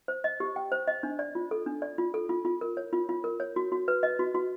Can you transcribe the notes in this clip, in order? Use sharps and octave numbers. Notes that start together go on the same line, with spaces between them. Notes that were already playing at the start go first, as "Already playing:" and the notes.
C5
D#5
G4
G5
C5
D#5
D4
D5
F4
A4
D4
D5
F4
A4
F4
F4
A#4
C#5
F4
F4
A#4
C#5
F#4
F#4
B4
D#5
F#4
F#4